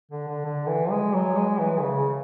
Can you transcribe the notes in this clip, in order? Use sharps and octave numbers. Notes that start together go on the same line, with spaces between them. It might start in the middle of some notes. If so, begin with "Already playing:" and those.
D3
D3
D3
E3
G#3
F#3
G#3
E3
C#3